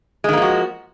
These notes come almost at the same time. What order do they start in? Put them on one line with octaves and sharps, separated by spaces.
G#3 D#3 A#3 F3 F#4